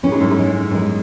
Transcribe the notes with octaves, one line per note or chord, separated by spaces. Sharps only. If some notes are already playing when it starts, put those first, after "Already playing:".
A2 C#4
G#2
F#2
G#2
G#3
F#2
G#2 G#3